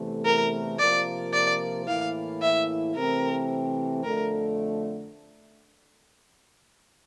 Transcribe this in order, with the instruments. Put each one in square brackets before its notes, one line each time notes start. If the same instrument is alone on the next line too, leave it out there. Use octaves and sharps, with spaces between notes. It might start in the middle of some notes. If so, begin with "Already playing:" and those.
Already playing: [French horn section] E2 C3 E3 A3
[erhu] A#4
[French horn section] C3 F3 A#3 F4 A#4 [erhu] D5
[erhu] D5
[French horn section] A2 E3 A#3 E4 [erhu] F5
[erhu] E5
[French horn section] C3 E3 A3 C4 [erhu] A#4
[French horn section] F2 D3 A3 [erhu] A#4